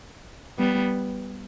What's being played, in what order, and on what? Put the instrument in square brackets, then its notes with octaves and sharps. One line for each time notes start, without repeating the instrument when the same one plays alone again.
[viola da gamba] G3 B3